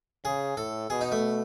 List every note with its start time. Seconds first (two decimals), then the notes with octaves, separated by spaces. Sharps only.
0.25 C#3 G#4
0.57 A2 A4
0.90 B2 G#4
1.01 D#4
1.12 A3